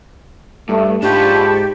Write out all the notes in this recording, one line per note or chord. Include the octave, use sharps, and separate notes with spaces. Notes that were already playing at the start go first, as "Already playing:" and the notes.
G2 A3
G#2 D4 F4 G4 A5 B5 C#6